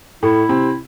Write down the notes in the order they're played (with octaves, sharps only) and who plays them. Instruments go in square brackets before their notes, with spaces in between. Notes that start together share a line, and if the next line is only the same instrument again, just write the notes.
[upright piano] A2 A3 [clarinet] E4
[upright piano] C3 C4